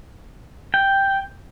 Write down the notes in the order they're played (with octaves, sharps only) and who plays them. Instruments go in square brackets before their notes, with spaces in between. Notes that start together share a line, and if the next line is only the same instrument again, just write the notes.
[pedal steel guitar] G5